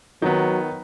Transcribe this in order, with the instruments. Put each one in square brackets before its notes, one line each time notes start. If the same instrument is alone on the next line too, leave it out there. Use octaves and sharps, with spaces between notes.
[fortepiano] D#3 B3 [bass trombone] F#3